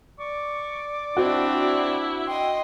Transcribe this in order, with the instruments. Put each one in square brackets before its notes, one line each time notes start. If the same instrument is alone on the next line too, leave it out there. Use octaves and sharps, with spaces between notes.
[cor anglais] D5 [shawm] C#6
[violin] C4 D4 [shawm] E4 [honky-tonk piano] F#4
[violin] D#5 C6 [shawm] G5